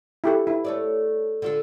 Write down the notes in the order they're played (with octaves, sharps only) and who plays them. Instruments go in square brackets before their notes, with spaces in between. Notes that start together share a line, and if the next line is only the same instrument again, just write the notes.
[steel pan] E4 G4 A4
E4
[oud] A3 C#5 D5
D3 F4 A4